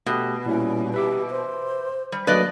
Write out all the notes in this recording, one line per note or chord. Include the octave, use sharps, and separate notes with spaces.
B2 A3 G4
A#2 G3 C#4 E4
G4 B4 E5 D6
C5
G3
F#3 A3 A#3 D4 B4 D5 D#5